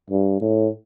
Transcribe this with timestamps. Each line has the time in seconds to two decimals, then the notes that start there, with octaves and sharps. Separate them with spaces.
0.11 G2
0.41 A2